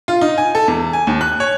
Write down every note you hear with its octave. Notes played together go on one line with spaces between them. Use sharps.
F4
D#4
G#5
A4
E2
G#5
D#2
F#6
C#5